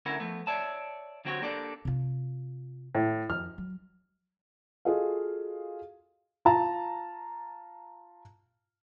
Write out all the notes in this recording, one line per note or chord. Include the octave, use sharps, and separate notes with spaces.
D2 D3 C#4 E4 A#4 F#5
F3 A3 B3
C#5 D5 E5 A5
D3 F#3 C4 F#4 G4 C#5
A#3 D4 G4 A4 D5
C3 F4
A2
F2 F6
F#3
F4 F#4 G#4 A4 D#5 F5
F4 A5 A#5